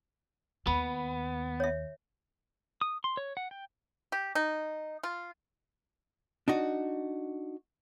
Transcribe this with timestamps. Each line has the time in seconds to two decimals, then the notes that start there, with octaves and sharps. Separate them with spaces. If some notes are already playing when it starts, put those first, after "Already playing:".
0.67 D#2 B3 B5
1.60 C#5 E5
2.81 D#6
3.04 C6
3.17 C#5
3.37 F#5
3.51 G5
4.12 G4
4.35 D#4
5.03 F4
6.48 D4 D#4 F#4